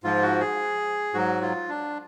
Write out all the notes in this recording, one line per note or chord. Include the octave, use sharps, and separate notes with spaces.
G#2 F3 F4
F#4
G#4
G#2 F#3 F#4
F4
D4